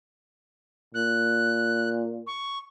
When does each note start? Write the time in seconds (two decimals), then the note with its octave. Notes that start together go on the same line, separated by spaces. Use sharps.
0.94 A#2 F#6
2.27 C#6